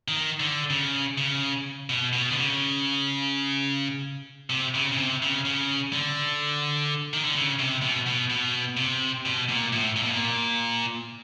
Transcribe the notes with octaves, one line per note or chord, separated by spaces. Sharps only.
D#3
D3
C#3
C#3
B2
B2
D3
C#3
C3
C#3
C#3
C3
C#3
C#3
D3
D#3
D3
C#3
C3
B2
B2
B2
C3
B2
A#2
A2
A#2
B2
A#2